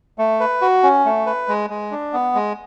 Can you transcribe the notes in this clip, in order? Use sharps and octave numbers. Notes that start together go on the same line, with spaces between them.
A3
B4
F#4
C#4
A3
B4
G#3
G#3
D4
B3
G#3